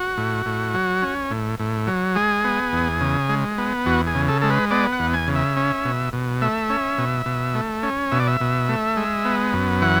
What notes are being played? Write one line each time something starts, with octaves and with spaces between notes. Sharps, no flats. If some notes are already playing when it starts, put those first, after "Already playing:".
Already playing: F#4
A2
A2
F#3
C#4
A2
A2
F#3
G#3 G#4
B3
E2
C#3
G#3
B3
E2 F#4
G#4
C#3
A4
G#3 A4
B4
B3 D5
F#5
E2
G#5
C#3
E5
C#4
B2
B2
A3 E5
C#4
B2
B2
A3
C#4
B2 E5
D5
E5
B2
A3
G#3
B3
F#2
E3 F#5